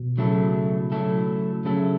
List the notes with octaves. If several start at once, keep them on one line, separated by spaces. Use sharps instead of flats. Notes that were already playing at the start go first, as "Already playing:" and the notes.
Already playing: B2
C#3 F#3 A3 E4 A4
F#3 A3 E4 A4
C#3 F#3 A3 E4 A4